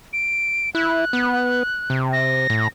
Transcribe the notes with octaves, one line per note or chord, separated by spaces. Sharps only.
D7
E4 F#6
B3
C3
A#6
A2